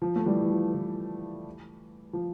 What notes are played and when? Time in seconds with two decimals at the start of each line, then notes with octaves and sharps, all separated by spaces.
0.02 F3
0.16 A3
0.26 E3 G3
0.41 E3
0.50 F3
0.74 E3
2.13 F3